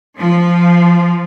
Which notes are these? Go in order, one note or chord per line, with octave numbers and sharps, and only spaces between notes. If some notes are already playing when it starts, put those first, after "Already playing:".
F3